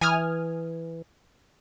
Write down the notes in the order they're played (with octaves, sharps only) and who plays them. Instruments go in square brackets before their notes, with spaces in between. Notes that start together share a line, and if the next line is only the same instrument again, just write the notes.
[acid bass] E3 [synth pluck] G#5 D#6 F6